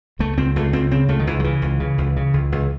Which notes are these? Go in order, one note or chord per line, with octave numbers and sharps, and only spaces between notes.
C#2 A3
C#2 C4
C#2 A3
C#2 C4
C#3 C4
C#2 A3
D#3
C#2 E3
F#3
C#3 E3
C#2
C#3
C#2
C#3
C#2
C#2